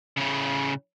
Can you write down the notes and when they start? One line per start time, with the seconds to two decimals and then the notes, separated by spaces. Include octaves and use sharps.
0.17 A2 C#3